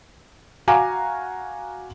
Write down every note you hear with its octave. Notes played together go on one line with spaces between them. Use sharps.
F#4 F5 G#5 A#5 D6